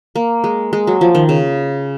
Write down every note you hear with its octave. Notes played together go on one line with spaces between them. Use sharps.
A#3
G#3
G#3
F#3
F3
D#3
C#3